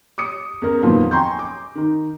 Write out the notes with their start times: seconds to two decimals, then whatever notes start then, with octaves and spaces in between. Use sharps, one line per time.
0.18 D6 D#6 C#7
0.62 E2 C#4 G#4 A#4
0.82 F2 A#2 D#3 F3 F#3 B3
1.11 G5 G#5 A#5 C6 C#6 G6
1.39 D6
1.75 D#3 D#4